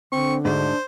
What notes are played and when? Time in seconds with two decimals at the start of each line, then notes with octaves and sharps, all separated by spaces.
0.12 D3 C4 C#6
0.45 D2 G#2 D4 C5